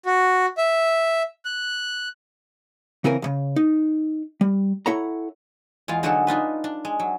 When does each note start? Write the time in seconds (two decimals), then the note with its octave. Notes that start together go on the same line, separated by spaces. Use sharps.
0.06 F#4
0.58 E5
1.45 F#6
3.04 C#3 E3 C4 A#4 G#5
3.22 D2 C#3
3.56 D#4
4.41 G3
4.86 E4 A4 C#5 F#5 A#5
5.88 E2 G#3 F4 F5
6.03 D3 F#3 G#3 D#4 A4 F#5
6.27 D4 D#4 F4 B4
6.64 D4
6.85 G#3
7.00 F#3